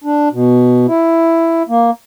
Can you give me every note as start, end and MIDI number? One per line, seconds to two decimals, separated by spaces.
0.04 0.29 62
0.33 0.87 47
0.88 1.63 64
1.69 1.90 58